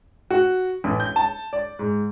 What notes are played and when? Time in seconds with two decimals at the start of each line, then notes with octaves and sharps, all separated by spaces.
0.30 F#4
0.84 A1
1.00 G6
1.16 A5
1.53 D5
1.79 G#2